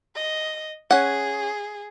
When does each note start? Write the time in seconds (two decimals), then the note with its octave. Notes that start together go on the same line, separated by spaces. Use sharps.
0.16 D#5
0.91 C#4 G#4 F#5